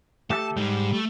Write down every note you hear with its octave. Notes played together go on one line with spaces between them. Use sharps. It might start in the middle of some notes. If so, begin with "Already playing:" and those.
A3 G4 A4 A5
G#2 G3
A3